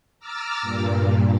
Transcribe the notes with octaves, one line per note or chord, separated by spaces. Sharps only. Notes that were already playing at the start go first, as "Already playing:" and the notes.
A#5 D6 E6 F6 A6
G2 A#2